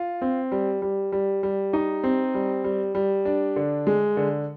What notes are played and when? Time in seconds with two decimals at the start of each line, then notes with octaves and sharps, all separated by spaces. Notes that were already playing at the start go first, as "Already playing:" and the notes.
Already playing: F4
0.22 C4
0.52 G3
0.82 G3
1.12 G3
1.43 G3
1.73 D#4
2.04 C4
2.34 G3
2.64 G3
2.95 G3
3.25 D4
3.56 D3
3.87 G#3
4.17 D3